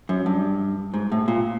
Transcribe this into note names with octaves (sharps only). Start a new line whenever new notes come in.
F#2
G2
G#2
A2
A#2